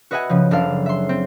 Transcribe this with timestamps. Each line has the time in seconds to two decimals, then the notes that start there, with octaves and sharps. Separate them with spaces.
0.11 F#4 B4 D#5 E5 F#5 G#5
0.29 C#3 F3
0.51 F#1 D4 A4 F5
0.86 E5 C6
1.09 C4